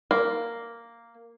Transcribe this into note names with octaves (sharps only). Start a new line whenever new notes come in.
A#3